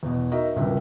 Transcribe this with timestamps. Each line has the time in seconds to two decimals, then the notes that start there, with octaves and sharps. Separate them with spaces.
0.03 E2 B2
0.31 D#4 F#4 A#4 D#5 E5
0.56 D#1 G#1 C#2 G2 A#4 E5